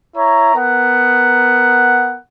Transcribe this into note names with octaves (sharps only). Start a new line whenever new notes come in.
E4 C#5 A#5
B3 A#4 F#5